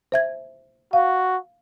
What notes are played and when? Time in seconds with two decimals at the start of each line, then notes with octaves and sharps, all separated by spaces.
0.12 C5 E5 G#6
0.93 F#4 F5